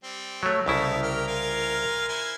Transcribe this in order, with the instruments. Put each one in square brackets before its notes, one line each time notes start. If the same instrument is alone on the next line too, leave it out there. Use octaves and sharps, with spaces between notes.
[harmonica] G3 C4
[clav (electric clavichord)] F#3 A3 [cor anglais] C#5
[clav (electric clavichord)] C2 C#3 E4 [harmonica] A3 D#4 F5 [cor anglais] A4
[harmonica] G4 F6 [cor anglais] A#4
[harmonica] F4 F5 G#5
E4 C5 G#5